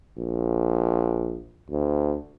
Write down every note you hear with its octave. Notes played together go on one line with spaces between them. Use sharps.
A#1
D2